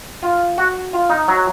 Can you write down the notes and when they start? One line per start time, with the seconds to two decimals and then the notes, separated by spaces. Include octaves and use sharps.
0.23 F4
0.58 F#4
0.93 F4
1.10 D#4
1.28 F#3